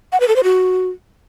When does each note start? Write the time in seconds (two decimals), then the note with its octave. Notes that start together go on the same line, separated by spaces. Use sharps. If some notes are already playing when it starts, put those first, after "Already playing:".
0.12 F#5
0.20 B4
0.28 A4
0.36 C5
0.44 F#4